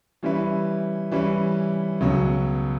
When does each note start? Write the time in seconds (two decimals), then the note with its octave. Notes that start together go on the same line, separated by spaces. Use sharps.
0.23 E3 G3 C#4 E4 B4
1.12 E3 G3 C#4 E4 B4
2.01 C#2 B2 F#3 C#4